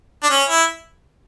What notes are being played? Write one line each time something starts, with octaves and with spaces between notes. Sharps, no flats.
D4
C#4
E4